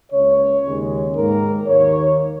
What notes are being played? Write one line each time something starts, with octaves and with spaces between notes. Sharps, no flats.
C#2 C#3 A#3 C#5
D#2 C#3 G#3
G#2 D#3 A#3 A#4
D#2 D#3 A#3 C#5